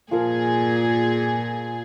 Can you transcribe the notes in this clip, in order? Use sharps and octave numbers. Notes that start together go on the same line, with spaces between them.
A#2 F3 G#4 A#4